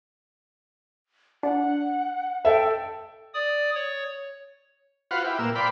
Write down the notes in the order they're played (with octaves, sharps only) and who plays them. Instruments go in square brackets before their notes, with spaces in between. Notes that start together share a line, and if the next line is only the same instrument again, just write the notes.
[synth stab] D4 [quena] F#5
[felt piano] A4 E5 [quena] G5
[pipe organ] D5 D#6
C#5
[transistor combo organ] F4 F#4 B4 C5 F5 F#5
E4 G4 B4
A#2 A#3 E6
B4 C5 D5 F5 G5 B5